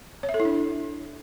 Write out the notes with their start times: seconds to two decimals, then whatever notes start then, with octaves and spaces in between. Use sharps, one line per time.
0.23 C#5
0.29 E5
0.34 A4
0.40 E4
0.45 D4